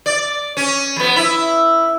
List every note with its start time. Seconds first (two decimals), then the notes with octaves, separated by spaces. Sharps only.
0.06 D5
0.57 C#4
0.96 F2 B3
1.16 E4